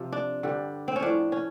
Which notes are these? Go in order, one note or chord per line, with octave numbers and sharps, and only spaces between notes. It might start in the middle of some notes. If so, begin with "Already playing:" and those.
Already playing: C3 F3
D4
G2 D3 G3
C4
C#4
A2 F3 D4
C#4